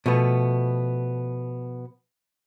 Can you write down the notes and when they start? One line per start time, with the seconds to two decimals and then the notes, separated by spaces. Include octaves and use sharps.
0.06 B2 F3 A3 B3